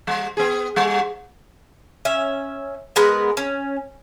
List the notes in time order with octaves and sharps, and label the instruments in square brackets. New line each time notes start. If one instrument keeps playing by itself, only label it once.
[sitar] G3
B3 G#4
G3
[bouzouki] C#4 E5
G#3 B3 A#4 B4
C#4